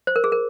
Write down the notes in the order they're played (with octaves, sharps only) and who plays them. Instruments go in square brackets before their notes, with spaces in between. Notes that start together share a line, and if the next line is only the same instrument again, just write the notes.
[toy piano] C5
A#4
G#4
A#4